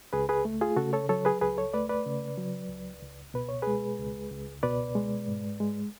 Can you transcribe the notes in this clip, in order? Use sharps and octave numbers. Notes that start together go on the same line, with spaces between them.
C#2 G#4 B4
G#4 B4
A3
F4 G#4
C#3 F#4 A4
A4 C#5
F#3 A4 C#5
G#4 B4
C#2 G#4 B4
A4 C#5
A3 B4 D5
B4 D5
C#3
F#3
C#2
C#2
B2 B4
C#5
G#3 G#4 B4
C#2
C#2
B2 B4 D5
G#3
G#2
G#3